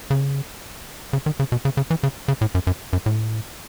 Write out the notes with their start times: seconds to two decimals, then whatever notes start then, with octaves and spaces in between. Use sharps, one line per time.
0.10 C#3
1.13 C#3
1.26 D#3
1.40 C#3
1.52 B2
1.65 C#3
1.77 C#3
1.90 E3
2.03 C#3
2.28 C#3
2.41 A2
2.55 F#2
2.67 F#2
2.93 F#2
3.06 A2